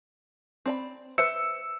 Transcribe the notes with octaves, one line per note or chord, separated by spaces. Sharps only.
C4 D5 B5
B4 C5 E5 E6 C#7